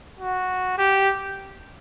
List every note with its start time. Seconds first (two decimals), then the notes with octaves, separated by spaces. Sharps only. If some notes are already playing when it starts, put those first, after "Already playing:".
0.20 F#4
0.78 G4